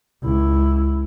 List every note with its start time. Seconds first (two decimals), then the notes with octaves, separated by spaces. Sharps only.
0.23 C#2 E4